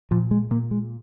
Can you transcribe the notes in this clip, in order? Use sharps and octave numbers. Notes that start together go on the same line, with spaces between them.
A#2 F3
G#3
A#2 A#3
G#3